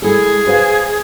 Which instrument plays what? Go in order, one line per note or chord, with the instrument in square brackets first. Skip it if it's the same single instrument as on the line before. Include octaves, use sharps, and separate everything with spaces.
[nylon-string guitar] G#3 E4 A4 [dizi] G#4
[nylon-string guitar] B4 C5 F5